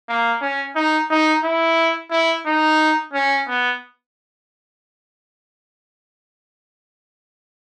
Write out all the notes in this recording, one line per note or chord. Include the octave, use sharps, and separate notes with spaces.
A#3
C#4
D#4
D#4
E4
E4
D#4
C#4
B3